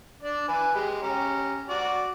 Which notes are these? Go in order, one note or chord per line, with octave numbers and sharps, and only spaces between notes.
D4 D5
B4 G#5
G#3 G4
C#4 G4 A#5
F#4 D5